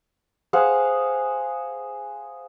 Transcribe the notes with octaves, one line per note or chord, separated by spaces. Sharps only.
G#4 C5 F5 F#5